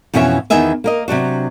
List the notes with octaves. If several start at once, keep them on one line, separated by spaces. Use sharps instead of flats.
F2 B2 E3 C#4 C#5 E5
E2 D#3 B3 D#5 E5 G#5
A#3 A#4 D#5
C3 F#3 D4 F#4